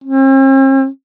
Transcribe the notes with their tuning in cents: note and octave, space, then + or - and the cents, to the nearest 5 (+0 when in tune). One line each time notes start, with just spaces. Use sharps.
C4 +45